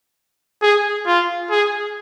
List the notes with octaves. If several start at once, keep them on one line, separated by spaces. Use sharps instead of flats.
G#4
F4
G#4